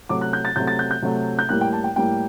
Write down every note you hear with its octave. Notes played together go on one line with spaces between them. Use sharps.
C3 F#3 A3 D6
F#6
G6
A6
C3 F#3 A3 G6
A6
G6
G6
C3 F#3 A3
G6
A2 G3 A#3 F#6
G5
A5
G5
A2 G3 A#3 G5